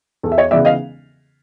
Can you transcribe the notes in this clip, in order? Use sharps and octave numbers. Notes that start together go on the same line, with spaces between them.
E2 A4
E5
C#5 D#5
C#3 E3 G#3 B3 D5 E5
D#5 F5